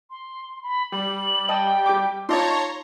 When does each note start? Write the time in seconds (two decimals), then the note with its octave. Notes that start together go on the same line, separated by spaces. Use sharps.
0.10 C6
0.63 B5
0.92 G3 F#7
1.49 D#5 G5 A5
1.86 G4 D6
2.29 D#4 F4 C#5 D5 A5 A#5 C6